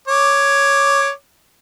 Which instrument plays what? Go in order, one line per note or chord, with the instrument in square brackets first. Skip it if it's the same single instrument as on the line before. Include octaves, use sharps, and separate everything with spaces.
[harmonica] C#5 D6